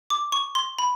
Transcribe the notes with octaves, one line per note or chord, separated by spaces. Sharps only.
D6
C#6
C6
B5